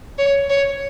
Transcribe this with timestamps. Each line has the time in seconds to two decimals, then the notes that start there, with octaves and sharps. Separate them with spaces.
0.18 C#5
0.50 C#5